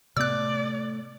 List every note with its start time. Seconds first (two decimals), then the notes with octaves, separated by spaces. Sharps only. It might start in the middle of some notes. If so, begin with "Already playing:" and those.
0.17 A2 C3 A3 B3 D5 E6 F#6